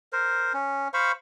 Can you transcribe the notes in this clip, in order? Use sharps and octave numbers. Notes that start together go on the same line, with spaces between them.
A#4 C5
C#4
C5 F5 B5 C#6